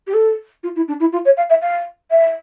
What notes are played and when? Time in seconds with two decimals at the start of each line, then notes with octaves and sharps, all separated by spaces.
0.07 G4
0.14 A4
0.63 F4
0.76 E4
0.88 D4
1.00 E4
1.13 F4
1.25 C#5
1.37 F5
1.50 E5
1.62 F5
2.11 E5